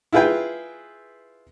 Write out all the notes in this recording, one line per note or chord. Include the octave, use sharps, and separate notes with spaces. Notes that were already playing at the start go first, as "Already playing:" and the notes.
E4 F4 G#4 B4 G5